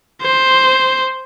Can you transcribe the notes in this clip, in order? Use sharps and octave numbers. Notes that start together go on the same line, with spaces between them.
C5